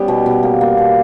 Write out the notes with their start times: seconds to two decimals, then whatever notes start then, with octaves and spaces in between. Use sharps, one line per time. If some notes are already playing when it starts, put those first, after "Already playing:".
Already playing: G3 B3 C#4
0.08 B2
0.26 B2
0.43 A#3
0.61 A#3
0.78 B2